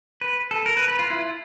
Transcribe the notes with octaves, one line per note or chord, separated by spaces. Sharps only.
B4
A4
A#4
B4
B4
F4
E4